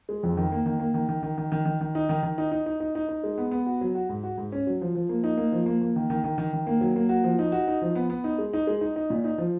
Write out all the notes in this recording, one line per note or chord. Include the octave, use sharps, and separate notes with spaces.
G#3
F2
D#3
A#3
D#3
A#3
D#3
D#3
D#3
D#3
D#3
D#3
D#3
D#4
D#3
D#3
D#4
D#4
D#4
D#4
D#4
D#4
G#3
B3
B3
F#4
F#3
F#4
G#2
F#4
G#2
C#4
F#3
F3
F3
A#3
D#4
A#3
F3
A#3
A#3
D#3
D#3
D#3
D#3
D#3
A#3
F#3
A#3
F#4
F3
D#4
F#4
D#4
F3
B3
B3
D#4
G#3
D#4
G#3
D#4
D#4
A#2
D#4
F3